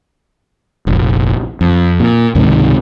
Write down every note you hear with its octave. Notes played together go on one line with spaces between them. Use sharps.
F1 A#1
F2
A#2
C#2 G#2 C3 D#3